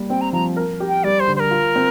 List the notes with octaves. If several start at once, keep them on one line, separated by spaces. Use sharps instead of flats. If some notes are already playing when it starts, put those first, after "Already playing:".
Already playing: G3 A#3
C4 G5
A#5
F3 A#5
A#4
G4
G5
G3 D5
C5
D3
C5
A#4
F4
C4